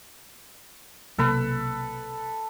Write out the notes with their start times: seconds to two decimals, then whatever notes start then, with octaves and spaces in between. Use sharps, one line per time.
1.18 B1 C3 A#3 A4 B4 B5